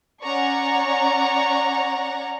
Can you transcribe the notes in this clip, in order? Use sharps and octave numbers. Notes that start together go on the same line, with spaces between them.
C#4 D5 F#5 A#5 C#6